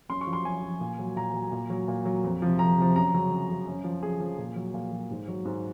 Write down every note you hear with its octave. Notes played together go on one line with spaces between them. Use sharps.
F#2 C6
C#6
F3
C6
F#2 G#5
F3
A#2
F#3
A#2 A#5
F#3
A#2
F#3
A#2
F#3
F2
C3 F3
F2 A#5
C3 F3
F#2 A#5
C#3 F#3
F#2
C#3 F#3
F#2
F3
F#2 G#4
F3
A#2
F#3
A#2
F#3
G#2
F#3
G#2